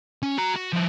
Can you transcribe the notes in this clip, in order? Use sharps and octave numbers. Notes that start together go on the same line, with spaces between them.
C#4
F#4 A#5
F#4
F3 E4